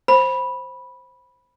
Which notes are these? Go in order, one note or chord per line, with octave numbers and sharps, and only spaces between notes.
C5 B5